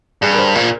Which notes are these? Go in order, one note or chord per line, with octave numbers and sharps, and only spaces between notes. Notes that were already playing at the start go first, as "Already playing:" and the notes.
G2 G#4
A#4
C5
A#2 A#4